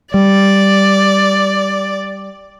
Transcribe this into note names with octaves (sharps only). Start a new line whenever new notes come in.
G3 D5